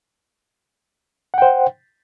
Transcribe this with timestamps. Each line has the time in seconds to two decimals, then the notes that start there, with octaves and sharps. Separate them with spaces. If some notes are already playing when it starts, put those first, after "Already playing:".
1.34 F#5
1.38 G5
1.42 C5